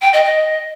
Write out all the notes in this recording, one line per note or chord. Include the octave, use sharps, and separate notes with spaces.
G5
D#5
D#5